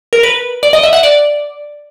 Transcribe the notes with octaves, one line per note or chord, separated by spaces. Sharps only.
A#4
B4
D5
D#5
E5
F#5
D5